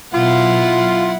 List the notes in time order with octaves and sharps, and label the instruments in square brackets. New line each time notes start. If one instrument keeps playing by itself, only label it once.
[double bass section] B2 F#3 [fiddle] E4 F#5 [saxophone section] F4